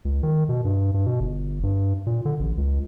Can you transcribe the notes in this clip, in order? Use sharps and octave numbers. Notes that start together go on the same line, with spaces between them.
C#2
D#3
B2
G2
G2
B2
G1
G2
A#2
D3
A1
C#2